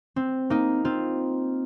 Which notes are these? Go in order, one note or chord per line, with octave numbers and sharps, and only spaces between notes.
C4
A#3 D#4
C4 F4